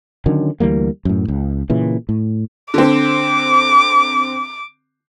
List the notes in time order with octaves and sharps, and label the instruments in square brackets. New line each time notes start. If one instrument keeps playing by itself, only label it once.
[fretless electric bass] D3 D#3 F#3 C#4
D2 E3 G3 A#3
F#2 A2
C#2
A#2 C#3 E3
A2
[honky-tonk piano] D3 C4 [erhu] D6